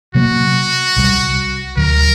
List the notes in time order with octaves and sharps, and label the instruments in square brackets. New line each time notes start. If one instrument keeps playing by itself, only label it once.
[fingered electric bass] C3 F#3 A#3 [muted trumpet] F#4
[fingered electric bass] C2 C3 G3
[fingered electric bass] D2 D3 F#3 [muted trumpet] A#4